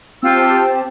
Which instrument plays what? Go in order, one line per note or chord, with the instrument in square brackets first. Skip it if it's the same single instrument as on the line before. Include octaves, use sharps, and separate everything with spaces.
[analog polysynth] C4 G4 A5 [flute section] F4 G5 E6